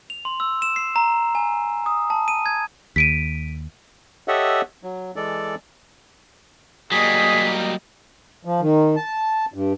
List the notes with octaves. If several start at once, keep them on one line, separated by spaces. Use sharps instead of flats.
F7
C6
E6
E7
C7
A#5
G#5
D#6
A5
D#7
G#6
D#2 B6 D7 D#7
G4 A4 C#5 D#5 E5 F#5
F#3
E3 G#3 A4 D5
F#3 G3 A#3 G#4 D#5 B6
F3
D#3
A5
G2